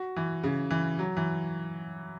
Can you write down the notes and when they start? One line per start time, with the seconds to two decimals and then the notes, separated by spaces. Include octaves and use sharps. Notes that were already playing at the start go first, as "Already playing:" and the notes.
Already playing: F#4
0.16 E3
0.43 C#3
0.70 E3
0.99 F#3
1.17 E3